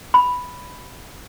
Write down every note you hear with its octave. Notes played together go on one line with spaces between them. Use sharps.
B5